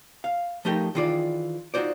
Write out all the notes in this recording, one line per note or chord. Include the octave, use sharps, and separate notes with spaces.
F5
F3 A3 D#4 G4 A#4
D#3 E3 F4 G#4 D5
D#4 F4 F#4 C5 D5